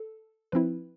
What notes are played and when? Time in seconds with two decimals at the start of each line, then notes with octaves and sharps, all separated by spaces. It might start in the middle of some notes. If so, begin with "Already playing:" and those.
Already playing: A4
0.52 F3 C4 E4 B4